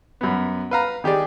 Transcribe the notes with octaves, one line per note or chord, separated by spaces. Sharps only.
F#2 B3
B4 F5 A#5
D#3 G4 G#4 D5